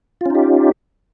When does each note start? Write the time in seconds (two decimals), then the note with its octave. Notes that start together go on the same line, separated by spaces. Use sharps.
0.21 F4
0.26 C#4
0.30 D#4
0.35 G4